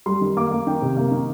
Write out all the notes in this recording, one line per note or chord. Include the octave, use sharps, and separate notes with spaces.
G3 C6
D#3
A#3 D6
A#3
D#3 G5
C3
A#3
D#3